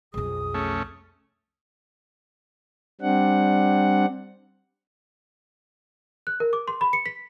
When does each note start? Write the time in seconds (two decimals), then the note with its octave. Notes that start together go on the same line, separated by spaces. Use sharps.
0.14 B1 F2 G#4 D#6
0.54 A3 C#4
3.01 G3 C4 D4 F#5
6.27 F#6
6.40 A#4
6.53 D6
6.68 C6
6.81 B5
6.93 C#7
7.06 B6